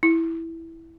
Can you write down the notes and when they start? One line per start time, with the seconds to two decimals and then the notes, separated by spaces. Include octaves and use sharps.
0.03 E4